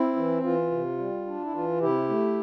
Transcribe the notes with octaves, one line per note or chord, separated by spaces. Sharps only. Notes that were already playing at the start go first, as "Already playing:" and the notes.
Already playing: C4 E4
E3
E3 F4
C3
G3
D4
E4
E3 F4
C3 E4 G4
A3